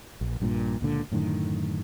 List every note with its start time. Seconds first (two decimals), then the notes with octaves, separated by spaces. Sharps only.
0.21 A#1
0.40 A#1 G2 A#2
0.81 C#2 A#2 D3
1.12 F#2 A2 D3 D#3